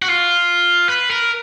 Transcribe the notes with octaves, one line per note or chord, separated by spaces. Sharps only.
F#4
F4
B4
A#4